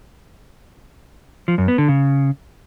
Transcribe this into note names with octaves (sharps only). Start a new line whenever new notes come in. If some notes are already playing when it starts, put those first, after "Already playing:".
F3
F#2
B3
D3
C#3